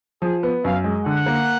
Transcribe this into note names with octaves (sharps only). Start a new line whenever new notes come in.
F3 G#4
B3
F#2 F5
G#3
D3 F#5
A#3